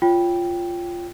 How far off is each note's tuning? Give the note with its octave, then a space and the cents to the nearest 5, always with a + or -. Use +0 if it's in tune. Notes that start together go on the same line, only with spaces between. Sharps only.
F4 -10 C#5 +0 G5 +0